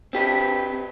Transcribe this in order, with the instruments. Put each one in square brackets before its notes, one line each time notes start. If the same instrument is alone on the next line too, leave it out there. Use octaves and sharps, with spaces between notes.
[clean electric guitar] C4 G4 B4